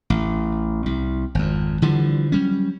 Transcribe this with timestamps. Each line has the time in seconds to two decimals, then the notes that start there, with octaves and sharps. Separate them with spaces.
0.10 A1
0.86 C2
1.35 G#1 F2
1.82 D3 E3 F3 G3
2.32 F#3 G3 C#4